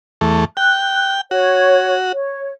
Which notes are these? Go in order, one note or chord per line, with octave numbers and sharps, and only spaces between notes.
E2 A3
G5 F#6
F#4 C#5
C#5